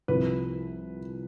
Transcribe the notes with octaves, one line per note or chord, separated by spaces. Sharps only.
C2 C3 F3 B4